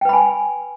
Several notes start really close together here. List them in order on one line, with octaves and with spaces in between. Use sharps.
G5 B4 B5 G#5